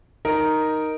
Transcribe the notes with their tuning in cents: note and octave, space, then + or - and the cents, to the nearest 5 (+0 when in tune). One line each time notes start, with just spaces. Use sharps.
D#4 +0 A#4 +0